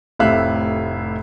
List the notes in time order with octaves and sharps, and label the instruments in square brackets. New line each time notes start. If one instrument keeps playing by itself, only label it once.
[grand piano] F1 A2 C3 E5 F5 F#6